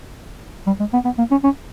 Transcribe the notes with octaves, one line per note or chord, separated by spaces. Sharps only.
G3
G#3
B3
B3
A#3
C#4
C#4